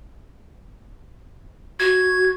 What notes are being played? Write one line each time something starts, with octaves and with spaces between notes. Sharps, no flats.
F#4 G#6